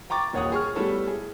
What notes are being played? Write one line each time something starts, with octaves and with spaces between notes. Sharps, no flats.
G5 A#5 C#6 D6 A6
D#1 D#2 C#5 F#5 D#6
G#4 C#6 F6
G3 A3 B3 E4 A4 C#5
G#4